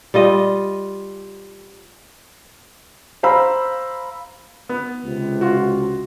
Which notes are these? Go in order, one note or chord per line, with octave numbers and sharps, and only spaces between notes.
G3 F4 D#5
C5 F5 A#5 B5 E6
B3
C#2 C3
F4 F#4